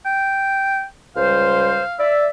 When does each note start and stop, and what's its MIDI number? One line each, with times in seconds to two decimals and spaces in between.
0.05 0.84 79
1.16 1.83 37
1.16 1.83 55
1.16 1.83 72
1.16 2.06 77
2.00 2.28 74
2.00 2.28 76